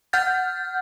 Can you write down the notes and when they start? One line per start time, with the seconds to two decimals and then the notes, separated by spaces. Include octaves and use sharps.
0.13 F#5 F6 G6 A6